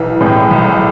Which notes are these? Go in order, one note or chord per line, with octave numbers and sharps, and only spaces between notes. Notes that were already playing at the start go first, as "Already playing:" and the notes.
Already playing: B1 E3
A2 G#3
B1